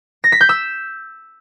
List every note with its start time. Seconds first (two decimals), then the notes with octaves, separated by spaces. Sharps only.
0.24 A#6
0.32 B6
0.41 G6
0.49 E6